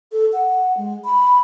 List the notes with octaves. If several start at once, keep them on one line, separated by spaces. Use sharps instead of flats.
A4
F#5
G#3
B5